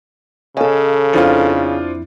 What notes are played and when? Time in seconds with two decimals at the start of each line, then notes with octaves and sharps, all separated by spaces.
0.57 C#3 A4 C#5 D#5 F5 G#5
1.13 F2 F3 D4 E4 F4